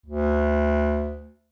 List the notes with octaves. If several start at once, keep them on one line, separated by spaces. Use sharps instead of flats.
D2